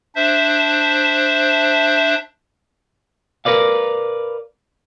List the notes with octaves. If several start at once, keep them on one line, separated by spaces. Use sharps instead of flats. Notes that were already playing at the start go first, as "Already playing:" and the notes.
D4 C5 E5
A#4 B4 D5 F5